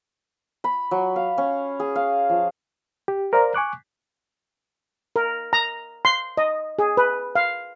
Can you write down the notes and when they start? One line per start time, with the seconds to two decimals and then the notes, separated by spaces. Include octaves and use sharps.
0.64 B5
0.91 F#3
1.16 F5
1.38 C#4
1.80 G#4
1.95 F5
2.29 F3
3.08 G4
3.33 A#4 C5 D5 F5 A#5
3.54 G#5 C#6 D6 F#6
5.16 A#4
5.53 A#5
6.05 C6
6.37 D#5
6.79 G#4
6.97 B4
7.35 F5